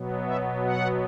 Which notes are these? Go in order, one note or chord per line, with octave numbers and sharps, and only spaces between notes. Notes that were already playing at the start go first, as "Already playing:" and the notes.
Already playing: B2 F#3 B3
E5
F#5